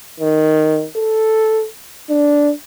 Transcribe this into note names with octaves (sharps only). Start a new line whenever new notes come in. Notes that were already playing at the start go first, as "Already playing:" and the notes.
D#3
A4
D4